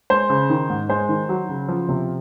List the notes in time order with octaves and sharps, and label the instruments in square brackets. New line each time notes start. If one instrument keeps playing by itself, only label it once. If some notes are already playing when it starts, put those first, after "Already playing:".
[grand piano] G#3 C5
C#3
D#3
G#2
G#3 C5
D#3
F#3
C#3
F3
C3